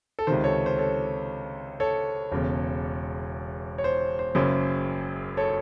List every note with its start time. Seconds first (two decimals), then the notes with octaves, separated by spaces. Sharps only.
0.19 A4
0.27 C#2 C3 D#3 C5
0.44 A4 C#5
0.66 C5
0.78 A4 C#5
1.80 A4 C#5
2.31 E1 E2 C#3
3.78 C#5
3.84 C5
4.19 C5
4.35 F#1 F#2 C#3 C5
5.37 A4 C#5